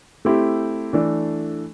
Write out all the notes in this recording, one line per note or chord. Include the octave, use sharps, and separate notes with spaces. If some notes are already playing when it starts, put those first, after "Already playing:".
A3 C4 E4 G4
E3 A3 D4 A4 D5